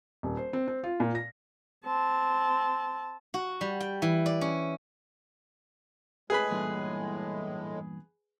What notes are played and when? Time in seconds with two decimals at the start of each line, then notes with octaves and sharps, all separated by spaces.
0.23 D#1
0.37 C5
0.53 C4
0.68 C4
0.84 F4
1.00 A#2
1.15 A#6
1.85 C4 A5
3.34 F#4
3.61 G3
3.80 G5
4.02 E3
4.26 D5
4.41 C#4
6.30 A2 G#3 G#4 B4 B5
6.51 E2 G2 A#2